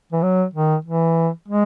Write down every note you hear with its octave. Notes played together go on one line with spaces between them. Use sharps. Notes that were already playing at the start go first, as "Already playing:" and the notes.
E3
F#3
D#3
E3
G#3